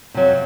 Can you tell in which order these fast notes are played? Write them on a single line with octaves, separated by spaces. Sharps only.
C3 F#3 F2